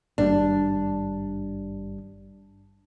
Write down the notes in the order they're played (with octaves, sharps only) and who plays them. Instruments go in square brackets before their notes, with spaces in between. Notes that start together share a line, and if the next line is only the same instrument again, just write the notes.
[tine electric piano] G#1 G2 G3 [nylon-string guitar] D4